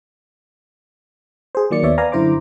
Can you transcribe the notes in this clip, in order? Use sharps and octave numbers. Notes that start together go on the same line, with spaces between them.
G#4 C5
D#3 F#3 A#3 D5 C#7
D#2 B3 C#5 D5 E5
B4 D5 F5 G#5 A#5
F#2 D3 E4 C5 A#5 D6